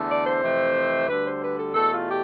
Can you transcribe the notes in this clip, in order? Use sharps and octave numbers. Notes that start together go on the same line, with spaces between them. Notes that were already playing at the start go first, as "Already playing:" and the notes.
Already playing: E2 D3 A3
D5
C5
F2 C3 E3 A3
D2 D3 G3 B4
C5
B4
A4
E2 B2 A3 A4
F4
G4